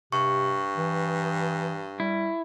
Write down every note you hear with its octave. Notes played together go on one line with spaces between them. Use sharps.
G2 C3 C#6
E3
G3 E4